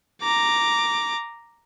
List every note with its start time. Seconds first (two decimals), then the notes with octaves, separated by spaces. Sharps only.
0.22 A#5 D6